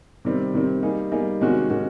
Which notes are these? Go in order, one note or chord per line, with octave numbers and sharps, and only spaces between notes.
C3 D#3 G3 C4
C3 D#3 G3 C4
G3 A#3 D#4 G#4
G3 A#3 D#4 G#4
C3 D#3 G#3 C#4 F#4
C3 D#3 G#3 C#4 F#4